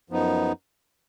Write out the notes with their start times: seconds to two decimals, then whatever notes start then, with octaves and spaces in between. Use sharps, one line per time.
0.10 F#2 F3 B3 D#4